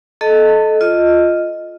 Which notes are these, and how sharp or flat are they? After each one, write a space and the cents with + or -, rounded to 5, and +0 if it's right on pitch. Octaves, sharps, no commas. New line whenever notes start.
A4 -20 D#5 +0 A5 +30
F4 +0 D#5 +0